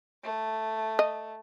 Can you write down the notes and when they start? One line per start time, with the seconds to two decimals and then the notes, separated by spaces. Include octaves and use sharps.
0.23 A3
0.99 D#5